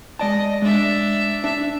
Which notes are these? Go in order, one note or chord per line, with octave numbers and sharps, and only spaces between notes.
G#3 D5 D#5 A5
G#3 D4 E5
D4 E5